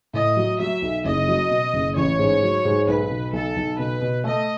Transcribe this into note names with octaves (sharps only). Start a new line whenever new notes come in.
A2 D#5
F#3
F#3 E5
B1
F#1 D#5
F#3
B2
F#1
A1 C#5
G#2
F#3
G#2
B1 B4
B2
B1 A4
B1
B2 B4
B2
A3 D#5